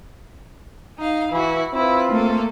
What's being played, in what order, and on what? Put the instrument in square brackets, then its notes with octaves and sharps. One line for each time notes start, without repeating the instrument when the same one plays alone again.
[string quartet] D#4 F5
[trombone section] E3 [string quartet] E4 F#4
[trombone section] C4 F4 [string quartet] E4 B4
[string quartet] A3 A#3 A4